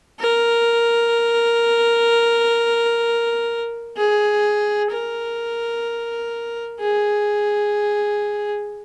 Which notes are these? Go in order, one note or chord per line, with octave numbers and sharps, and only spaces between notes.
A#4
G#4
A#4
G#4